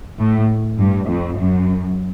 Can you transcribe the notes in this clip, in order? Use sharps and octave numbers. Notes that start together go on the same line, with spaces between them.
A2
G2
F2
F#2